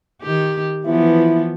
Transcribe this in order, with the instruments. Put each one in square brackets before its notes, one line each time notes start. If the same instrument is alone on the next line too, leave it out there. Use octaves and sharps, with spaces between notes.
[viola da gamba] D#3 G4
[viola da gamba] E3 F3 B3 [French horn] E4